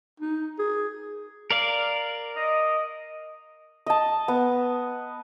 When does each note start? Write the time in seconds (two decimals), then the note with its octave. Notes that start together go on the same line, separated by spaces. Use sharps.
0.20 D#4
0.59 G#4
1.51 A#4 D5 F5
2.35 D#5
3.86 D#5 A5
4.28 B3